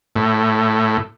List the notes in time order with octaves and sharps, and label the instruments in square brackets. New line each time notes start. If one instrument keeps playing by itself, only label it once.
[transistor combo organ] A2